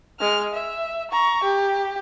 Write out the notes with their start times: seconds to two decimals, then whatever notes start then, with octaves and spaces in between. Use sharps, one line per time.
0.20 G#3 F6
0.53 E5
1.11 A#5 C#6
1.43 G4